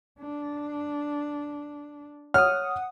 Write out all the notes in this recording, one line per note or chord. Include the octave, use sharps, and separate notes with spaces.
D4
C#5 F#5 D#6 F6